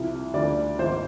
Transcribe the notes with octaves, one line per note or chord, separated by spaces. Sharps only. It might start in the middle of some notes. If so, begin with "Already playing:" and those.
Already playing: C2 C3 F3
D2 D3 F3 D5
G#1 G#2 F3 C5